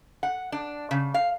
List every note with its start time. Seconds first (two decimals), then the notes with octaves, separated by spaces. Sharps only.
0.23 F#5
0.52 D4
0.91 C#3
1.14 F5